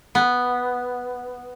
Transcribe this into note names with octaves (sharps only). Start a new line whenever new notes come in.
B3